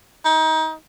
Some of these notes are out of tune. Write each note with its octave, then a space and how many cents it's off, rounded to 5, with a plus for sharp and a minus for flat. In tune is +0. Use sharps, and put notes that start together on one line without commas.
D#4 +30